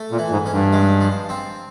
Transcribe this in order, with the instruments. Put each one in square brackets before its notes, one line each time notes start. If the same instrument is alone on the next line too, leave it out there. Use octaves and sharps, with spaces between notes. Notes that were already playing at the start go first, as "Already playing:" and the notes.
Already playing: [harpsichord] A3
[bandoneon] A#2
[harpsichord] E3
[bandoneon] G#2
[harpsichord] C#4
[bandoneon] G2
[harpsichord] G#3
F3
C4